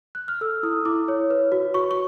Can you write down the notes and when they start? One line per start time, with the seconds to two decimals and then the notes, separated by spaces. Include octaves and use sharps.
0.15 F#6
0.28 F6
0.41 A4 E6
0.63 E4 D#6
0.85 E4 D6
1.08 C#5
1.30 B4
1.52 F#4
1.74 F#4 C#6
1.91 C#6